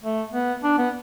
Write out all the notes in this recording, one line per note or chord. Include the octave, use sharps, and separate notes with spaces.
A3
B3
D4
B3